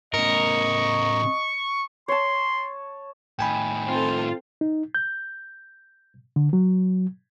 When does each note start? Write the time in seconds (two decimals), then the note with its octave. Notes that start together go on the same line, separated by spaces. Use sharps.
0.14 A2 C#3 A#4 D#5 C#6
2.08 C#5 A5 C6
3.39 A2 D#3 G5 G#5 B5
3.89 C4 F4 A4
4.61 D#4
4.95 G6
6.36 D3
6.53 F#3